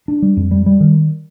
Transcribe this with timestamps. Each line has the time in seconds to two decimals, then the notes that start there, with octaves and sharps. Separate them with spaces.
0.08 D4
0.22 G3
0.37 F2
0.51 G3
0.66 G3
0.80 D#3